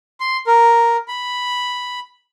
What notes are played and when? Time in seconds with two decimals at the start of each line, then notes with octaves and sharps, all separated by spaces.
0.20 C6
0.47 A#4
1.08 B5